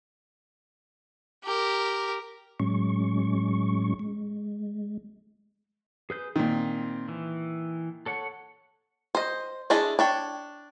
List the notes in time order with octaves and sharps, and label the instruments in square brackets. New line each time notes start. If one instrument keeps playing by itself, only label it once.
[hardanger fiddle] G4 A#4
[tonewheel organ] A2 F#3 G#3 C#4 C#6
G#3
[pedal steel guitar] G#4 B4 G6
[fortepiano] A#2 D#3 [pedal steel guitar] C4
[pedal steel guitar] E3
A4 C#5 F#5
[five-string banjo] C5 D#5
A3 D4 E4 G#4 D#5
D4 C#5 G5